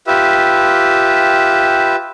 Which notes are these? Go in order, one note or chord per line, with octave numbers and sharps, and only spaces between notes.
F4 G4 B4 E5